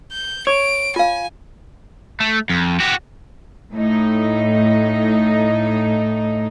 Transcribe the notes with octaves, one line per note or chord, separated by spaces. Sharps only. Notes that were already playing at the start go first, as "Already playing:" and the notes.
G6
C#5 D7
F4 F5 G#5
A3
F2
F#4 G4
A2 D#4